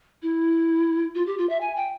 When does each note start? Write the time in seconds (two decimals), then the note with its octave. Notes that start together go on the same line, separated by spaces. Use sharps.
0.22 E4
1.15 F4
1.27 G4
1.38 F4
1.49 E5
1.61 G#5
1.76 G5